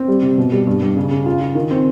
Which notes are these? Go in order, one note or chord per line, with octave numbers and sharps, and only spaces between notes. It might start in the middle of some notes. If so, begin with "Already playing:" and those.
Already playing: C4
G3
C3
B2
G3
G2
G2
C#3
C#3
F4
F4
D#3
C4